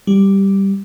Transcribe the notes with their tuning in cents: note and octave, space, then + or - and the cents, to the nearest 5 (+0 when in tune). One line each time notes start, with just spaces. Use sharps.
G3 +0 G4 +0